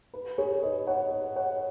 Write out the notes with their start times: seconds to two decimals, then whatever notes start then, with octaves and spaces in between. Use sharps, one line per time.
0.14 B4
0.38 G#4 C#5
0.63 B4 D#5
0.87 C#5 F#5
1.36 C#5 F#5